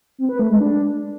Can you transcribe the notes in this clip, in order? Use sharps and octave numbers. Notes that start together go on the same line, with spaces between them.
C4
B4
A3
G#3
D4